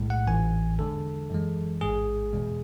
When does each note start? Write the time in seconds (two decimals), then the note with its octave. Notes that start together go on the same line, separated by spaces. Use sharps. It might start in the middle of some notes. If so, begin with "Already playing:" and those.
Already playing: B1 A2 G#3
0.10 F#5
0.27 A1 G#2 E3 G#5
0.78 E2 D3 G#3 A4
1.30 F#2 E3 G#3
1.81 A1 G#2 G#3 G#4
2.33 E2 B2 G#3